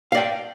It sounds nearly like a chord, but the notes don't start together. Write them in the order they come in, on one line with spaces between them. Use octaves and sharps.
F5 D5 G5